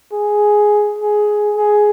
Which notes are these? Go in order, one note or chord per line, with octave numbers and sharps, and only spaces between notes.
G#4
G#4
G#4